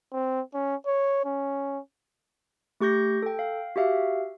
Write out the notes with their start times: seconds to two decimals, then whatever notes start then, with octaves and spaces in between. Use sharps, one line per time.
0.13 C4
0.54 C#4
0.86 C#5
1.25 C#4
2.80 A3 G4 C#6 G6 A#6
3.22 A4 G5
3.39 F5
3.76 F#4 G4 E5 F5